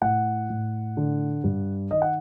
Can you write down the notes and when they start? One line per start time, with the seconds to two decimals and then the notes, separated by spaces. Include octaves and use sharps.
0.01 A2 F#5
0.50 A2
0.97 D3
1.44 G2
1.91 D#3 D#5
2.02 F#5